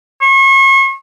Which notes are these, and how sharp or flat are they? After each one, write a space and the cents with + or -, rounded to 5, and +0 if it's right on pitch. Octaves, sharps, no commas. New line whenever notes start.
C#6 -40